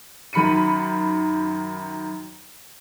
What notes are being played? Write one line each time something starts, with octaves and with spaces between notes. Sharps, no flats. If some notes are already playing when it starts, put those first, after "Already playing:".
F#2 D#3 B5 C#7 D#7